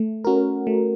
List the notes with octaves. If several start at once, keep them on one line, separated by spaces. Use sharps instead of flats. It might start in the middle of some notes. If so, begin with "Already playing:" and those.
Already playing: A3
C#4 F#4 A#4
A3